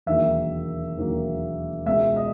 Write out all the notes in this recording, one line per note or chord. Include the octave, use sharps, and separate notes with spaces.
E1 D#2 D#3 F#3 A#3 E5
E1 D#2 D#3 F#3 A#3
C#2 B2 G#3 E5
D#5